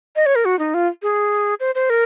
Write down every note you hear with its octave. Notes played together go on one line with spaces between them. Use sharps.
D#5
C#5
A#4
F#4
D#4
F4
G#4
C5
C5
A#4